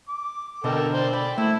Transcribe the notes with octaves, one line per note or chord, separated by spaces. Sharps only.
D6
B2 D3 A4 A#4 D#5 G5
C5 D5 G5
D5 G5 B5
A3 E4